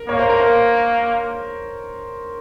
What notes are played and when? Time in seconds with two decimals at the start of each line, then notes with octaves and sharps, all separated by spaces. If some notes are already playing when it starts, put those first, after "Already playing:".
Already playing: A#4
0.09 A#3 C#5
0.19 C5
0.29 A#4
0.40 C5